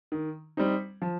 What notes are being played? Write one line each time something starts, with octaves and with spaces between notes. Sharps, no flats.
D#3
G3 C4 D#4
F3